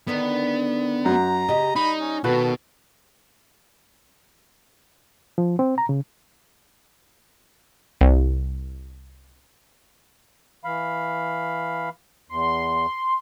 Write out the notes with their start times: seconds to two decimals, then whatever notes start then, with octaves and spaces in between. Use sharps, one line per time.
0.08 D3 D#3 B3 D4
1.05 F#2 A#5
1.49 C#3 G4 D#5
1.76 G3 D#4 B5
1.99 C#4
2.24 B2 D#3 F#3 F#4 A4 B4
5.38 F3
5.59 C4
5.78 A#5
5.89 C#3
8.01 C2
10.65 E3 F5 B5
12.29 E2 C6